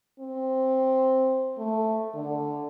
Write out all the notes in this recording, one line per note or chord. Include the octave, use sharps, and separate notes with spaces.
C4
A3
D3